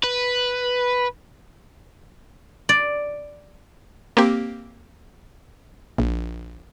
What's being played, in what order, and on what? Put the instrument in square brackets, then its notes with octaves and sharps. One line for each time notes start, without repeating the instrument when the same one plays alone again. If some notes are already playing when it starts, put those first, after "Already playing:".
[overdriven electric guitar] B4
[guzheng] D5
[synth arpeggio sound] A#3 C4 G4
A#1